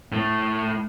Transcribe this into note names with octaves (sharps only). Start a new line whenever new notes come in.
A2 A3